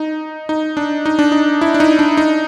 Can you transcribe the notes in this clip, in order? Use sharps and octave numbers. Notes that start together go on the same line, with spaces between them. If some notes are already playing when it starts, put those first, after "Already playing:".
Already playing: D#4
D#4
D4
D#4
D4
D#4
E4
D4
D#4
D4
D#4